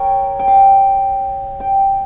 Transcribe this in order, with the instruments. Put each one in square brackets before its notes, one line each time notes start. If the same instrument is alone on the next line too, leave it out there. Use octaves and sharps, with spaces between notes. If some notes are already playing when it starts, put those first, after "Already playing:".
Already playing: [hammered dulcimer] A#4 C#5 G5
G5
F5
G5